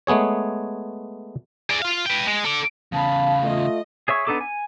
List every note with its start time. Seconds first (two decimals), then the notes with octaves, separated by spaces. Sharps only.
0.07 G#3 A3 B3 G#4 C#5
1.70 G#4 D5
1.82 F4 F5
2.06 B4 G5
2.27 G#3
2.45 A4 D5
2.92 E2 C#3 F5 A5 B5
3.43 A3 F4 D#5
4.08 G#4 C#5 E5 C#6
4.27 B3 D4 D#4 A4 D6
4.40 G#5